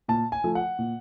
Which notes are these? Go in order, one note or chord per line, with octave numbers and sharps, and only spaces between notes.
A#2 A5
G#5
F3 A3
F#5
A#2